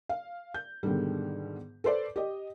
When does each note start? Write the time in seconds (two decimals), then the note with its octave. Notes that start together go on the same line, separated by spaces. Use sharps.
0.09 F5
0.54 G6
0.83 G#2 B2 D3 D#3 G3
1.84 A4 B4 C5 D5
2.16 G4 D#5